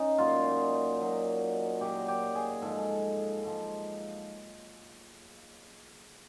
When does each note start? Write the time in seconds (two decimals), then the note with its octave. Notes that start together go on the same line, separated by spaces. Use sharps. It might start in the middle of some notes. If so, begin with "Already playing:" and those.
Already playing: C#4 D#4
0.18 A#2 F#3 F4
1.00 A#2 F#3
1.81 A#2 F#3 G4
2.08 G4
2.35 G#4
2.62 G#2 F3 A4
3.43 G#2 F3